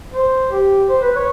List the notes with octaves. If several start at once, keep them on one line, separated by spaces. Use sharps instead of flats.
C5
G4
C5
B4
C#5